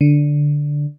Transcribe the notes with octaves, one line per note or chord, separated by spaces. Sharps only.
D3